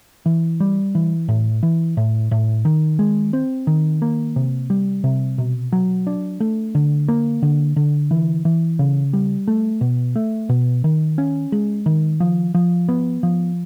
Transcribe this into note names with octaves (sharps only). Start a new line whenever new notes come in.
E3
G3
E3
A2
E3
A2
A2
D#3
G#3
C4
D#3
A#3
C3
G3
C3
B2
F#3
D4
A3
D3
A#3
D3
D3
E3
E3
C#3
G3
A3
B2
A3
B2
D#3
C#4
G#3
D#3
F3
F3
B3
F3